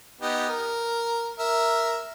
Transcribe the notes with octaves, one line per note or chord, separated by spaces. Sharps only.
B3 D#4 G4
A#4
A#4 E5